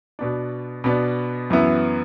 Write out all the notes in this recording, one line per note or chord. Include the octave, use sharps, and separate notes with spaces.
B2 B3 D4
B2 B3 D4
F#2 E3 B3 E4